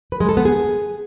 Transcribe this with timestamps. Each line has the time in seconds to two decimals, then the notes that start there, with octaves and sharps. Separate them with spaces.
0.12 B4
0.20 G#3
0.29 A4
0.37 B3
0.45 G#4